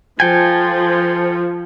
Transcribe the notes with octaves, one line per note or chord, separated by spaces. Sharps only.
F3 A4 G5 G#5